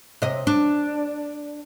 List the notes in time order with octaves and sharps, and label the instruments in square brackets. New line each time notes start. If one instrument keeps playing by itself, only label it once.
[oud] C3 D#5
D4